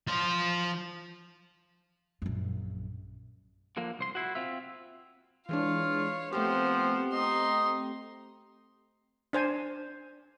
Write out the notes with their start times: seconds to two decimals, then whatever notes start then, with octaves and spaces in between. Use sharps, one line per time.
0.07 F3 C5
2.22 A#1 F#2
3.77 D3 F3 A#3
3.99 C2 C5 C6
4.15 E4 F#4
4.35 C4 F4 E5
5.49 E3 G#3 D4 F4 C#5 F5
6.33 F3 A3 B3 C4 G4 C5
7.13 D#4 D#5 C6
9.33 D4 C5 G#5